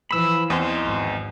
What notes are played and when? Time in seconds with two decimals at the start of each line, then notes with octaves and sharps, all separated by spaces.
0.11 E3 F3 B5 E6
0.50 E2 C4 D#4 C6
0.85 G#1